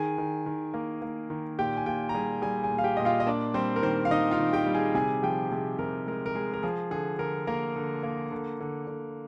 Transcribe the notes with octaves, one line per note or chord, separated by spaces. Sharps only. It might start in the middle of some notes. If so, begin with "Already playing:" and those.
Already playing: D#3 G#4 G#5
D#3
D#3
A#3
A#3
D#3
A#2 G4 G5
G#5
A#2 G4 G5
A#5
G3 G#4 G#5
G3 G#4 G#5
G#4 G#5
A#2
F5
G4 G5
A#2 D#5
F4 F5
D#5
A#3 D4 D5
G3 C4 C5
A#4
D#3 C4 C5
F5
D#3 D#4 D#5
F4 F5
D#3
G4 G5
G3
G#4 G#5
C3 G#4 G#5
F3 G4 G5
C3 G#4
C3 A#4
G#3 A#4
A#4
G#3 G#4
A#4
F3 G#4
D3 G#4
D3 A#4
A#3 A#4
D3
A#3
D3
D3
D3